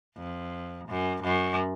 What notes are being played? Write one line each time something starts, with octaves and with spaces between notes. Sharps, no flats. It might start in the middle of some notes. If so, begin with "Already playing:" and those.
F2
F#2
F#2